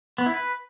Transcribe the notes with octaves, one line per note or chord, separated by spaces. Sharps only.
B3
E4
B4